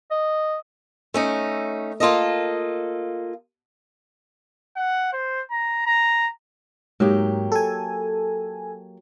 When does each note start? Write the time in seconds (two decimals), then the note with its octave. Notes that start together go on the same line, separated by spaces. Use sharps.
0.11 D#5
1.14 A3 C#4 D#4
2.00 A#3 F4 A4 D#5
4.77 F#5
5.13 C5
5.51 A#5
5.86 A#5
7.00 G#2 F#3 A#3 G4
7.52 A4 G#5